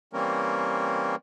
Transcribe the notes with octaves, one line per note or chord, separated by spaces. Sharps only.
E3 G3 A#3 C4 C#4 A#4